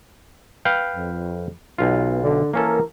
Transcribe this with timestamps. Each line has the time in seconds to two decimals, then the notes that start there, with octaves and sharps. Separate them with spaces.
0.65 B4 F5 G5
0.95 F2
1.78 B1 B3 F4
2.22 D3
2.53 E3 A#3 C#4 A4 A#4